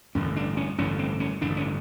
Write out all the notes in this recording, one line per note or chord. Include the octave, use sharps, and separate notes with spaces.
A1 G2 D3 C#4
D4
C#4
A1 G2 D3 C#4
C4
C#4
A1 G2 D3 D4
C#4